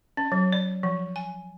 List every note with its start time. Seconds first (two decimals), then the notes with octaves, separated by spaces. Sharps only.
0.17 C#4
0.32 F#3
0.52 D5
0.83 F3
1.16 G#5